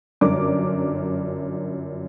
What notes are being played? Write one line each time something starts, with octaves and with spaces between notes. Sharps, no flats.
G1 F#2 D4 A#4 D6